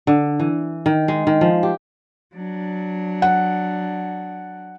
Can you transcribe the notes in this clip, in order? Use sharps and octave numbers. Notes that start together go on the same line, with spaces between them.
D3
E3
D#3
G#3
D#3
F3
G4
F#3 D4
F#5